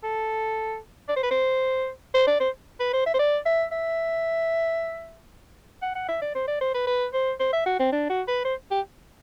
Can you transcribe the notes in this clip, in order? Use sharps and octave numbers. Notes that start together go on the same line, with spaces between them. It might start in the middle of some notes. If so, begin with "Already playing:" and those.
A4
D5
C5
B4
C5
C5
D5
C5
B4
C5
E5
C5
D5
E5
E5
F#5
F#5
E5
D5
C5
D5
C5
B4
B4
C5
C5
E5
F#4
C4
D4
F#4
B4
C5
G4